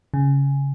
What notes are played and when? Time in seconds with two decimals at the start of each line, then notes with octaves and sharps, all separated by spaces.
0.14 C#3